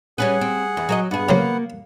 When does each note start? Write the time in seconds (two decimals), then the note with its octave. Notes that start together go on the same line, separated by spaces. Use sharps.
0.18 G3 C#4 G#4 B4 F#5
0.41 C4
0.77 E2
0.89 F#3 A#4 D#5
1.11 G2 B3 G#4 F#5
1.29 C#3 F#3 A#3 C5